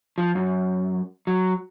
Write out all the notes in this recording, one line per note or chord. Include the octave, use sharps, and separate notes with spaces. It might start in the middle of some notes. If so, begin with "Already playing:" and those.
F3
F#2
F#3